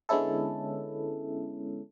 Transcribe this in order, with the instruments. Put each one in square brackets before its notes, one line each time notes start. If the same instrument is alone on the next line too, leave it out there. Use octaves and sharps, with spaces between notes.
[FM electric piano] D3 G#3 B3 C#4 E4 A4